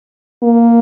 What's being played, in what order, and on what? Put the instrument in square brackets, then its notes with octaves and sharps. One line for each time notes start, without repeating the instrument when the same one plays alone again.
[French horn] A#3